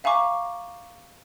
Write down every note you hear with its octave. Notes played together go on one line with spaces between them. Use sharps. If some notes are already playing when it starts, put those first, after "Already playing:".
E5 F5 G#5 A#5 C#6 D6